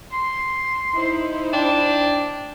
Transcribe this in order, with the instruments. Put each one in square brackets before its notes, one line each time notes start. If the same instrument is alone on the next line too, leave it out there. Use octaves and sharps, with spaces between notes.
[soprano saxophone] C6
[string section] D#4 E4 C5
[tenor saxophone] D4 [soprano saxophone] G5